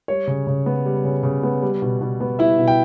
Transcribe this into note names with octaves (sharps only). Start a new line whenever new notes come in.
G3 C#5
C#3
C#3
B3
G3
C#3
C#3
B3
G3
B2
B2
B3
G3 E4 E5
B2
G5